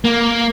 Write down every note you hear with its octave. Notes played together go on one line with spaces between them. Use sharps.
A#3